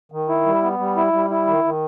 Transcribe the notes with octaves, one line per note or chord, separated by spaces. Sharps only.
D#3
E4
G3
B3
G3
E4
G3
E4
D#3
D#3